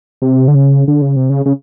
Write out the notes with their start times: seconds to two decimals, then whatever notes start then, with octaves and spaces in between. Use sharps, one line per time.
0.22 C3
0.48 D3
0.55 C#3
0.88 D3
1.02 C#3
1.16 C3
1.30 C#3
1.46 C#3